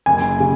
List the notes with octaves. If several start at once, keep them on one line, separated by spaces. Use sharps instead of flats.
F#1 G#5
C#3